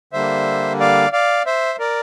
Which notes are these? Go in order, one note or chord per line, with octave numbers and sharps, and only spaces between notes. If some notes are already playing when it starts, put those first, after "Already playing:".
D3 G3 A#3 C5 E5
D5 F5
D5 F5
C5 E5
A#4 D5